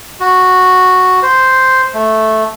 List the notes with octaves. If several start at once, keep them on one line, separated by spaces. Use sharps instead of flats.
F#4
C5
A3